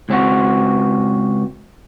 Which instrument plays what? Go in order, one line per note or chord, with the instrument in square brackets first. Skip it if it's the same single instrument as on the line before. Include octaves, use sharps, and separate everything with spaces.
[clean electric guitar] C#2 C4 F#4